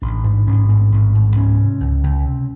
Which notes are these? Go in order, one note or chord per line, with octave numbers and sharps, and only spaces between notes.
A1 D4
G#2 D4
A1 C#4
G#2 C4
A1
G#2
C#2 C#4
C3
C#2
C#2
C3